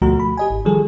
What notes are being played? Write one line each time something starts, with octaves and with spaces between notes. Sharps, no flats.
D2 B2 F3 A3 F#4 A#5
B5
G4 D#5 G#5
G#1
D#3 F3 G3 G#4 A4